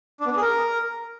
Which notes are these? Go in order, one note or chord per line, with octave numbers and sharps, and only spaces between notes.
D4
B3
D4
G#4
A#4